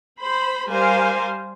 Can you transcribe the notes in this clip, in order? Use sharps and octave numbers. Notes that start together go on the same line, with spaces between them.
C5 B5
G3 A#4 C5 F5 G#5